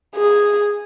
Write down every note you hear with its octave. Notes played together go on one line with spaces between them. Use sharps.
G#4